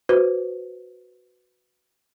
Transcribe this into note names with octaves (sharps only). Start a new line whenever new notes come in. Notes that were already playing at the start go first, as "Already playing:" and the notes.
F#4 B4 C5